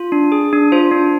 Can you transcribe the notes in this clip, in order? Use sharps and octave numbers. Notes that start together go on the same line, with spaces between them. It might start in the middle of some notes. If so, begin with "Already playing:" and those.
Already playing: F4
D4
G#4
D4
F4 C5
D4